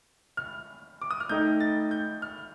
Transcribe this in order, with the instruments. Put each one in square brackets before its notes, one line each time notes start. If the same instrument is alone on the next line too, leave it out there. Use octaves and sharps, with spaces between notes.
[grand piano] F6
D6
D#6
F6
[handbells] A3 D#4 A4 D#5 G5 [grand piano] G6
[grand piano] A6
G6
F6